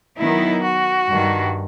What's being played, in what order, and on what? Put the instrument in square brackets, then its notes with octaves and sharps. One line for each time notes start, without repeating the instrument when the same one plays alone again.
[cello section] D#3 F#3 B3 D#4 [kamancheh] E4
[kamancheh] F#4
[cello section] G2 D#3 G3